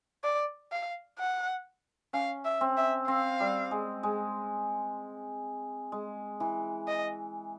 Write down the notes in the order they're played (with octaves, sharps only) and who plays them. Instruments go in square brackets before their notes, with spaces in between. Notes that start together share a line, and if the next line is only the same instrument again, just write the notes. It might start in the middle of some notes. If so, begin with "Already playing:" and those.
[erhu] D5
F5
F#5
[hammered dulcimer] C#4 [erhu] F5
[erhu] E5
[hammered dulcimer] C4
[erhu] E5
[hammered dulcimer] C4 [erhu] F5
[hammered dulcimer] G3
G#3
G#3
G#3
E3
[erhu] D#5